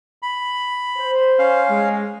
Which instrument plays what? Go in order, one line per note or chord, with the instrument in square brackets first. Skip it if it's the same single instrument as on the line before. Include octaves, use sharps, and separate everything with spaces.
[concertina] B5
[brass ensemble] C5
[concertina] C#4 F5
[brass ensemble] G#3